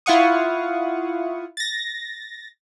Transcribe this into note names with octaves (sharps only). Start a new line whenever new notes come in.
E4 F4 F5 F#5 C#6 D#6
A6 A#6